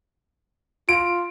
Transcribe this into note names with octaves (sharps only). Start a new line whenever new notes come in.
F4 D7